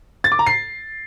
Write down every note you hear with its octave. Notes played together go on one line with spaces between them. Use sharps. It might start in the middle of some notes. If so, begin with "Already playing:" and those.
A6
D6
A#5
C7